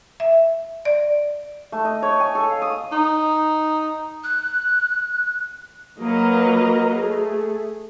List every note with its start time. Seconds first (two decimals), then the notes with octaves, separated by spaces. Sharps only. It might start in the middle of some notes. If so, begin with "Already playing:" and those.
0.20 E5
0.85 D5
1.72 A3
1.85 D#5
2.02 C#5
2.20 G#5
2.35 A4
2.50 F5
2.62 D#6
2.92 D#4
4.23 F#6
6.00 F#3 A#3 A#4 B4 D#5 A#5
6.95 A3 G#4